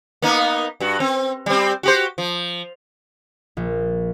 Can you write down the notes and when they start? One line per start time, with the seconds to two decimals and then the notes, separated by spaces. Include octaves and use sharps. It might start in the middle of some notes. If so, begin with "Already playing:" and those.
0.22 A#3 B3 D#4
0.80 G2 F#4
1.00 C4
1.46 G3 C4
1.83 F#4 G4 C5
2.18 F3
3.57 A#1